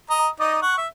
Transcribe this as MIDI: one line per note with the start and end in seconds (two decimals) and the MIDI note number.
0.10 0.28 75
0.10 0.28 82
0.40 0.60 63
0.40 0.60 74
0.40 0.60 75
0.62 0.77 78
0.62 0.77 85
0.78 0.87 76